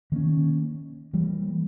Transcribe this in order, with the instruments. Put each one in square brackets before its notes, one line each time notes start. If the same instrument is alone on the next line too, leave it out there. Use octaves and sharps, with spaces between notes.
[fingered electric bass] D#3 A#3 C#4
E3 G3 A#3